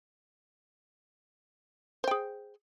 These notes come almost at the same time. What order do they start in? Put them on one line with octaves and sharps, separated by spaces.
C5 G5 G#4